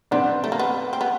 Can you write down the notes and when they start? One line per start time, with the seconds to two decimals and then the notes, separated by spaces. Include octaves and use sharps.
0.11 B3 C4 D4
0.44 A3
0.52 A#3
0.59 B3
0.93 C4
1.01 B3